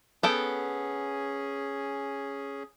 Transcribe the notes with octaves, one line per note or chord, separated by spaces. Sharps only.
B3 C#4 G#4 A4 G5